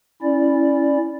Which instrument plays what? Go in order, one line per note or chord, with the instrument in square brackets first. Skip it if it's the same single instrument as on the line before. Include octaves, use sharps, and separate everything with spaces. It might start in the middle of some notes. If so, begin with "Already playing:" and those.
[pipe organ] C#4 E4 D5